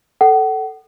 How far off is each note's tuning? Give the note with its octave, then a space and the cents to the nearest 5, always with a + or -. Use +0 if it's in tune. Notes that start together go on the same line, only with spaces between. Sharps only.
A4 +0 F#5 +35